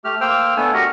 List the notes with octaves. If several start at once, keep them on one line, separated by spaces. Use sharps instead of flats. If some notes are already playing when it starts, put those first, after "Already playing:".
A3 G4 F6
A#3 C5 G5 E6 F6
A3 B3 D4 A4 G#5
F#4 G4 A#4 D#5 F#5